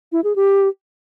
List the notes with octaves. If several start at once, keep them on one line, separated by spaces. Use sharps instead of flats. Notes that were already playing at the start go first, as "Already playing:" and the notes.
E4
G#4
G4